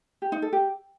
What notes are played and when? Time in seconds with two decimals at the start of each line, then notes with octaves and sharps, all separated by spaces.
0.22 G4
0.32 D#4
0.42 A4
0.53 G4